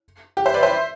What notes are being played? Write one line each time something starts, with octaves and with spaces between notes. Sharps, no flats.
G4
C5 E5
B4 D5
C5 E5